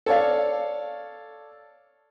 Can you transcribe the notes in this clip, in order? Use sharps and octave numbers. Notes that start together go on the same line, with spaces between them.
A4 C#5 D5 F5